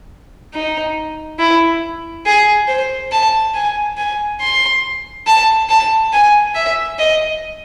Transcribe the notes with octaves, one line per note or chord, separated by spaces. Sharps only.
D#4
E4
G#4
C5
A5
G#5
G#5
C6
A5
A5
G#5
E5
D#5